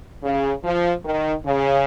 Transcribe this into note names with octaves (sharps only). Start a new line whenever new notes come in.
C#3
F3
D#3
C#3